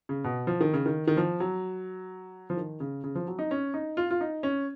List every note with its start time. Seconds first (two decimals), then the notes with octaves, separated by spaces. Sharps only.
0.09 C#3
0.24 B2
0.47 F3
0.61 D#3
0.74 C#3
0.86 D#3
1.07 D#3
1.17 F3
1.40 F#3
2.50 F3
2.57 D#3
2.80 C#3
3.04 C#3
3.15 F3
3.28 F#3
3.39 D#4
3.51 C#4
3.74 D#4
3.97 F4
4.11 F4
4.21 D#4
4.43 C#4